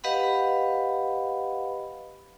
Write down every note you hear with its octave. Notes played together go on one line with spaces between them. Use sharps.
G4 B4 D#5 F5 F#5 B5